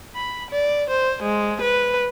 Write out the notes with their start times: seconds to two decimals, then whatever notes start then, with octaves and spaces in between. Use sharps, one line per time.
0.15 B5
0.51 D5
0.90 C5
1.23 G#3
1.61 B4